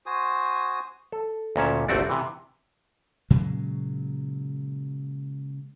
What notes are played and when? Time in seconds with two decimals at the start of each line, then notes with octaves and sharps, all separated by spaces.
0.06 F#4 C5 G#5 D#6
1.12 A4
1.56 D2 A#2 C#4 A5
1.88 G1 C2 A3 C4 F#4 D5
2.09 C3 E3
3.30 A#2 C#3 F#3 G#3